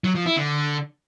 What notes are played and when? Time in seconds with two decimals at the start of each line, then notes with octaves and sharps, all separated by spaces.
0.04 F#3
0.15 F3
0.26 E4
0.36 D3